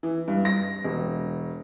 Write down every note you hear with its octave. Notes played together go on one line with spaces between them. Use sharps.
E3
G2
A#6
E1